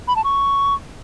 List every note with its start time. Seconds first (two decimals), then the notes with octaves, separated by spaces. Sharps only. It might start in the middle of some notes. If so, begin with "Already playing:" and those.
0.08 B5
0.16 A5
0.24 C#6